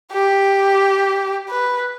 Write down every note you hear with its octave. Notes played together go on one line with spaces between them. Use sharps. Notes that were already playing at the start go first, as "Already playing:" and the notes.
G4
B4